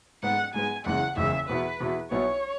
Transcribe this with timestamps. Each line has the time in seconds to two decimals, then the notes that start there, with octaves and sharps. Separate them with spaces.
0.23 G#2 G#3 B3 F#5
0.54 G#2 G#3 B3 G#5
0.86 F#1 E2 C#3 E3 G#3 F#5
1.17 F#1 E2 C#3 E3 G#3 E5
1.49 E2 B2 B3 E4 B4
1.80 E2 B2 B3 E4
2.11 B1 B2 B3 E4 C#5